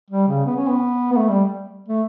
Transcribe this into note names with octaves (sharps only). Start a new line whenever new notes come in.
G3
C#3
B3
C#4
B3
B3
A3
G3
A3